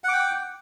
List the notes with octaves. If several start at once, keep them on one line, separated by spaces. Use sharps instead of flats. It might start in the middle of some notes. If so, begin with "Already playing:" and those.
F#5 G5 D6